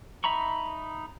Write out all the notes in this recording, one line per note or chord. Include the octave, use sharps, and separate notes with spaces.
D#4 E5 A#5 B5 C#6